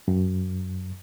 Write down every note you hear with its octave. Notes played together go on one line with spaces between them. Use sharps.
F#2